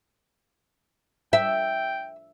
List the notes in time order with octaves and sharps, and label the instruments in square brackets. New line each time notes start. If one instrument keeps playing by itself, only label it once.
[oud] E5 [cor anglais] G5